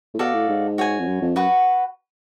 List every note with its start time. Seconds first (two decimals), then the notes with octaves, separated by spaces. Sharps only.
0.14 A2
0.19 B2 F#4 A4 D5 F5
0.34 A2
0.49 G#2
0.78 F#4 C#5 G#5
0.99 F2
1.07 F#2
1.21 F2
1.36 F#2 F#4 B4 F#5 C#6